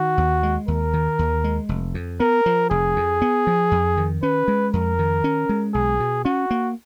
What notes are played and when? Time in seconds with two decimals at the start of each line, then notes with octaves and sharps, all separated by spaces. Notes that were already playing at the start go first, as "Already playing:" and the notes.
Already playing: D#3 F#4
0.18 D#2
0.43 G#3
0.68 D#2 A#4
0.94 D#3
1.19 D#2
1.44 G#3
1.69 F1
1.94 F2
2.20 B3 A#4
2.46 F3
2.70 F1 G#4
2.96 F2
3.22 B3
3.47 F3
3.71 F2
3.97 D#3
4.23 C#4 B4
4.48 G#3
4.73 F2 A#4
4.99 D#3
5.24 C#4
5.49 G#3
5.74 B1 G#4
6.00 B2
6.25 C#4 F#4
6.51 A#3